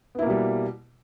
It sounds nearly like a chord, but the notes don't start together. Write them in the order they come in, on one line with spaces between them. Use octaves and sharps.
B3 E4 A#3 B2 G3